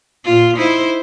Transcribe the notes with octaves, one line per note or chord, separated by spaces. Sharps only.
A#2 F4
D#4 E4 C5